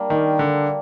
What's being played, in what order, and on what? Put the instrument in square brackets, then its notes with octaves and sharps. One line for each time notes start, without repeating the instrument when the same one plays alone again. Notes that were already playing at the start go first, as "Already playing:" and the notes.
Already playing: [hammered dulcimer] G3 A#3 D4
[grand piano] D#3
D3